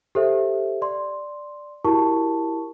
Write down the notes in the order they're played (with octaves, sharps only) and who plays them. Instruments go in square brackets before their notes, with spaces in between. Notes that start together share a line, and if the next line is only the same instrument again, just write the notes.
[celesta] G4 A4 C5 E5
D5 C6
E4 F#4 G4 A#4 A5 C#6